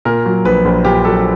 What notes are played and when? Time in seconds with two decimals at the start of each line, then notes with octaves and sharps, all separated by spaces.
0.05 A#2 A#4
0.26 F#3
0.45 A#1 B4
0.65 A#1
0.85 A#2 G4
1.05 F#3 A4